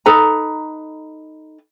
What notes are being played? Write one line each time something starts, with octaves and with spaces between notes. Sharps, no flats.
D#4 A4 B4 A#5